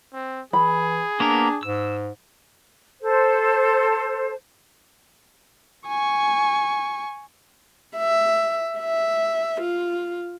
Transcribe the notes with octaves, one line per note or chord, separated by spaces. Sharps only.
C4
E3 G#4 B5
A#3 B3 D4 A#4
G#2 E6
A4 C5
G#5 C#6
E5
E5
F4